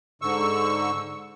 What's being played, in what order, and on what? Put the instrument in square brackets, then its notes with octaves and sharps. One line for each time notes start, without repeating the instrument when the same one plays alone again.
[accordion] G#2 D3 C#6 E6